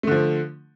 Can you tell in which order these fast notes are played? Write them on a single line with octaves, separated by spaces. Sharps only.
A3 D3 F3